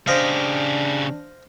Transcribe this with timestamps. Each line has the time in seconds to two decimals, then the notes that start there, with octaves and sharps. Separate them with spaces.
0.07 C#3 D4 G4 C5 D#5 F5